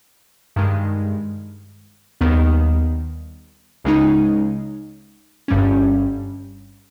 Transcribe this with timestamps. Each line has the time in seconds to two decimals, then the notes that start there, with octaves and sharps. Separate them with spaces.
0.56 G2 D#3 G#3
2.21 D#2 D#3 G3 B3
3.84 C#2 C#3 G#3 D#4
5.48 G1 G2 G3 C#4